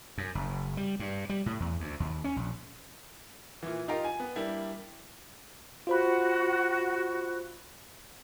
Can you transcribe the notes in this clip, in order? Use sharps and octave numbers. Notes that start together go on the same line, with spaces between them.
F#2
F#1
G3
G2
G3
A2
E2
D2
D#2
C#4
A#1
A#2 E3
D#4 F4 G4 A#4 F5
G#5
B3
G3 A#3 D4 E4
F4 F#4 C5 B5